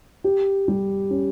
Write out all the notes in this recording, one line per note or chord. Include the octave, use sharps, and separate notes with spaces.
G4
G3
C#4